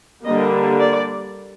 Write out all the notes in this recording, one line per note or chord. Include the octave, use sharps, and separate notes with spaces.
D3 G3 A#3 D#5
D5